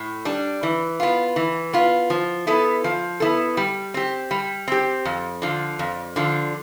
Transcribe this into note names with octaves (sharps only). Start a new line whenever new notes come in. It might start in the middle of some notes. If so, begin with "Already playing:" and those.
Already playing: A2
G3 D4
E3
B3 F4
E3
B3 F4
F3
B3 E4 A4
F3
B3 E4 A4
G3
C4 G4
G3
C4 G4
F2
D3 F3
F2
D3 F3